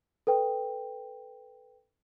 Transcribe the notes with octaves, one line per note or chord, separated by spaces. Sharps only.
A4 B4 G5